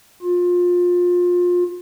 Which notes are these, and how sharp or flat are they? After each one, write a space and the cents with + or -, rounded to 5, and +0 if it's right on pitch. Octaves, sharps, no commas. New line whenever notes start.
F4 +25